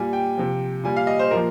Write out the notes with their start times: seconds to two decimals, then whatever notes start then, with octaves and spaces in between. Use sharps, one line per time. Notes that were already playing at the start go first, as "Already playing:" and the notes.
Already playing: A#2 G3 G#5
0.13 G5
0.38 C3 F3
0.83 A#2 G3 G#5
0.96 F5
1.07 D#5
1.19 C5
1.31 A#2 F3 A#4